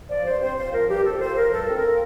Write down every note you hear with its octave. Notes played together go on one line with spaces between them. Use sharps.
F3 D5
G2 C5
C4 C5
F4 C5
F3 A#4
G2 G4
C4 A4
F4 C5
F3 A#4
G2 A4
C4
A#4
F4